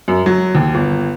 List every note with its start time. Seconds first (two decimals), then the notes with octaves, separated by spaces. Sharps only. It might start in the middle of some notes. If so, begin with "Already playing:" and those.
0.08 F#2
0.26 F#3
0.55 D#2
0.74 G1